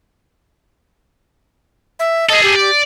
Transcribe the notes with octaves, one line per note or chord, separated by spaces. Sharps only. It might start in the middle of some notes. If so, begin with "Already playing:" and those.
E5
G#4 A4 D#5
G4
D5